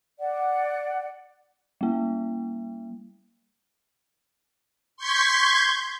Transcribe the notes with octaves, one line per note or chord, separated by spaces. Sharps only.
D5 F#5
G3 A#3
C6 C#6 G6 G#6 B6